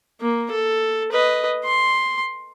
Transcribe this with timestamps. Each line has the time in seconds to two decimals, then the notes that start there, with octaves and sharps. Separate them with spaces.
0.21 A#3
0.51 A4
1.12 B4 D#5
1.65 C6